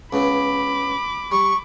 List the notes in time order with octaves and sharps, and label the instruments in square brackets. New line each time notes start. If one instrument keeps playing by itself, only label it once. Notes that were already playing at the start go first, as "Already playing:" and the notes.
[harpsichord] C#2 C#3 B3 [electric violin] B5 D6
[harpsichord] G3 [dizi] C#6